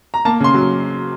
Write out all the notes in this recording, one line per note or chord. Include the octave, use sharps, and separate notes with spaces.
A#5
A#3 A5
C#3 C6
F#3